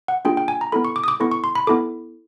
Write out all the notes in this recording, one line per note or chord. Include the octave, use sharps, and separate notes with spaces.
F#5
A#3 D4 F4 G#4 G5
G5
G#5
A#5
B3 E4 A4 B5
C#6
D6
D#6
D6
B3 E4 A4 C#6
C#6
C6
B5
B3 E4 A4 D6